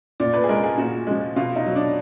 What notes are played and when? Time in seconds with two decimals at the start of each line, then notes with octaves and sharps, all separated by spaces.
0.20 A#2 D5
0.34 B4
0.44 G#4
0.49 G#3 A#4
0.64 G#4
0.78 A#2 F#4
1.07 F3 G#3
1.36 B2 F4
1.56 D#4
1.66 F#3
1.76 D4